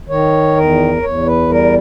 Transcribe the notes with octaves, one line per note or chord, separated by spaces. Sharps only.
D#3 C#5
E2 A#4
E2 C#5
B4
G3 A#4